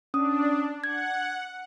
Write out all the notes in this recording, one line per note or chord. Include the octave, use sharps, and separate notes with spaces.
C#4 D4 D#6
F#5 G#6